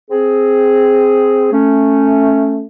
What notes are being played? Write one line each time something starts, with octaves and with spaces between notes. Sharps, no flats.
C4 G#4
A3 C#4